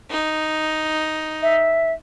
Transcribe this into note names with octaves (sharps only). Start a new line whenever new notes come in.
D#4
E5